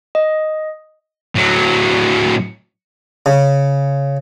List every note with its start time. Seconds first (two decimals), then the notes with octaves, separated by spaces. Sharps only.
0.15 D#5
1.36 A2 F#3
3.26 C#3